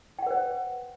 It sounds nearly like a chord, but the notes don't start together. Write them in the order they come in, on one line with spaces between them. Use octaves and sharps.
G5 F#5 B4 C5